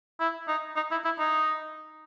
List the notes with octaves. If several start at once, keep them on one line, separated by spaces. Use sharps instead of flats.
E4
D#4
D#4
E4
E4
D#4